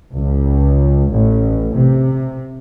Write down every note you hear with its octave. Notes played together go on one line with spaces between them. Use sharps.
C#2
A1
C3